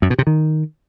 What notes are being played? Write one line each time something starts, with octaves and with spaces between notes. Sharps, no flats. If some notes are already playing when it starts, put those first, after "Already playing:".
F#2
B2
C3
D#3